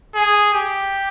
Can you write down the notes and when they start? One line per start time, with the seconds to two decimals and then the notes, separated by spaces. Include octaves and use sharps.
0.15 G#4
0.54 G4